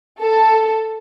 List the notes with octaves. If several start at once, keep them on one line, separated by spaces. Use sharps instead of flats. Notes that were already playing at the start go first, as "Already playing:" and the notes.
A4